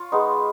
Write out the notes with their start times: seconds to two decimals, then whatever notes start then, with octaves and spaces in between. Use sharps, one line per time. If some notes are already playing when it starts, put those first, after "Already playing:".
Already playing: F4 C#5
0.12 G#3 B3 D#4